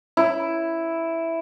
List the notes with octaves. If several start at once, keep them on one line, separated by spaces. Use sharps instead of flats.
E4